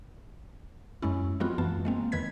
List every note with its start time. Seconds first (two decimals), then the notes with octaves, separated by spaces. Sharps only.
1.02 F#2 G#3 C#4 E4
1.40 F3 G#3 B3 C4 F4 F#4
1.58 F#2 E3 B3 A5
1.85 G#3 A#3 C4
2.12 E2 D#3 B4 G#6 B6